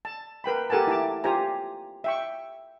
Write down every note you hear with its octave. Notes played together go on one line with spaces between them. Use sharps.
A5
A#4 B4 G5 B5
G4 A4 A#4 F#5 G#5 A5
E4 E5 A5 D6
F4 G4 C5 G#5 A#5
E5 G5 C#6